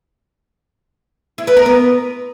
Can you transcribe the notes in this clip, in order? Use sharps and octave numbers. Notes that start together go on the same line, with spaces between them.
E4
B3
A#4
B3